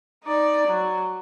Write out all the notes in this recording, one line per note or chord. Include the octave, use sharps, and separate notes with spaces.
D#4 D5
F#3